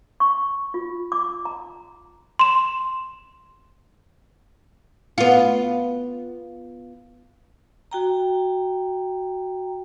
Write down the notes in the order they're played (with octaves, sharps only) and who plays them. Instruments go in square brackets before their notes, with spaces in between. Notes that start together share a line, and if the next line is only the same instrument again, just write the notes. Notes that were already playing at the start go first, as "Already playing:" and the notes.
[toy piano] C#6
F4
D6
A#5
[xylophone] C6 E7
[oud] B3 F4
[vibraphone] F#4 G5 A#5